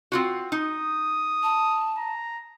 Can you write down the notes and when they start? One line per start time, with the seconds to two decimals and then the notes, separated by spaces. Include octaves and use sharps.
0.12 C4 F4 F#4
0.52 D#4 D#6
1.43 A5
1.98 A#5